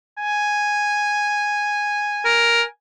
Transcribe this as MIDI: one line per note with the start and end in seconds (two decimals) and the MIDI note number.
0.19 2.71 80
2.25 2.62 70